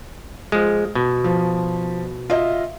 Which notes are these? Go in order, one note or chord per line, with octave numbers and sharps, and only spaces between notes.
F3 G#3
B2
F3
F4 D#5 E5